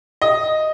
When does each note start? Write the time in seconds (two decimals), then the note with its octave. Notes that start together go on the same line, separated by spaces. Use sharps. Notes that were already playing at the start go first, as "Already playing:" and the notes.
0.22 D#5